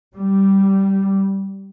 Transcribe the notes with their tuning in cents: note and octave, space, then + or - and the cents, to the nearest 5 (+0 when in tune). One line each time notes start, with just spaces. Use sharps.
G3 -10